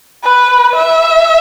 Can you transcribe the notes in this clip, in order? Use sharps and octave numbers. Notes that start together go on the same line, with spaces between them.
B4
E5